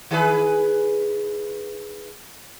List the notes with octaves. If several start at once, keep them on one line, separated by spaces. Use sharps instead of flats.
D#3 G#4 B4